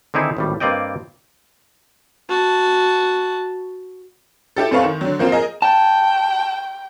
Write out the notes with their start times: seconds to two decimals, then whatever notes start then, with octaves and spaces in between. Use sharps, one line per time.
0.14 D3 D#3 C4 D#4 E4 G#4
0.37 G#1 A2 G3
0.60 G2 A#3 C4 D5 D#5 G5
2.29 F#4 A5
4.56 E4 G4 A4
4.71 F#2 C4 A4 B4 F5 C#6
4.84 D#3
5.01 D3 F#3
5.19 F3 A#3 C4 F4
5.32 G#4 A#4 D#5
5.62 G5 A5